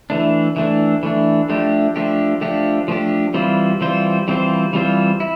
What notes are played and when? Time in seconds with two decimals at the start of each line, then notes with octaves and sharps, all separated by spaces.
0.10 E3 A3 D4
0.56 E3 A3 D4
1.03 E3 A3 D4
1.49 F3 A3 D4 G4
1.96 F3 A3 D4 G4
2.41 F3 A3 D4 G4
2.88 F3 A3 D4 G4
3.34 E3 G3 C4 F4 C5
3.81 E3 G3 C4 F4 C5
4.28 E3 G3 C4 F4 C5
4.73 E3 G3 C4 F4 C5
5.20 E4